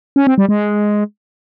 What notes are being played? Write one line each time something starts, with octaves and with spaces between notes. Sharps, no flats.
C#4
C4
G3
G#3